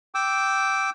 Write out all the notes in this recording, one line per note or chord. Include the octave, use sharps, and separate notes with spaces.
G5 D6 E6